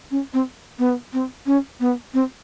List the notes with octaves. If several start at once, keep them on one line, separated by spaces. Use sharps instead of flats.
C#4
C4
B3
C4
C#4
B3
C4